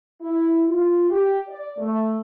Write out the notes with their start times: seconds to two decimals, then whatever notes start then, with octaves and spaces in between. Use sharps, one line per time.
0.22 E4
0.68 F4
1.11 G4
1.48 D5
1.78 A3